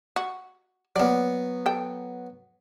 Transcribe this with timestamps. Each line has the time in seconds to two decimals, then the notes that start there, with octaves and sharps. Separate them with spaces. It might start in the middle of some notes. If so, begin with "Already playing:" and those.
0.16 F#4
0.96 F#3 A#3 B3 D5
1.66 A4 G5